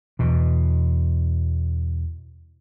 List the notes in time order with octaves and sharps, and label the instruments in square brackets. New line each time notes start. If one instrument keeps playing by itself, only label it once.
[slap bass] E2 B2